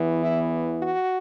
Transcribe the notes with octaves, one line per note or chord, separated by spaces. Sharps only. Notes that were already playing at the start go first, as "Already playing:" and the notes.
Already playing: E2 E3 B3
E4
F#4